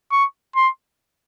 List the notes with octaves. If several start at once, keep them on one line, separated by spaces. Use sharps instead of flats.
C#6
C6